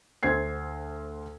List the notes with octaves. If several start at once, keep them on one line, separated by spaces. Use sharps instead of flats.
D2 C5 G#6 C7